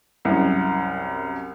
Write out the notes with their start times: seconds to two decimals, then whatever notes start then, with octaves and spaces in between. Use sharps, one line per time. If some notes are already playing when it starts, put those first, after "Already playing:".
0.25 C2 F#2